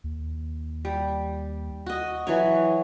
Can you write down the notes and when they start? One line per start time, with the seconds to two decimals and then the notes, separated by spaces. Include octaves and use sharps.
0.04 D#2
0.85 G3
1.86 F#4 D#5
2.27 E3 F#3 C#5